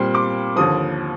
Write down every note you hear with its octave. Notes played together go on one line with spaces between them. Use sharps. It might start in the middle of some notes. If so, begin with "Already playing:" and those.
Already playing: A#2 G3 C4 C6
D6
D#2 D3 F3 D#6